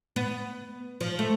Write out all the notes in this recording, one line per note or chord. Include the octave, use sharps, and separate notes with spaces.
B3
F3
A3